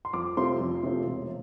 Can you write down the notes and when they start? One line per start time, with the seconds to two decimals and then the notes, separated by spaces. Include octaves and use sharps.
0.05 C6
0.13 F2 D6
0.37 C3 F3 A3 C4 C6
0.61 F2
0.83 C3 F3 A3 C4
1.06 E1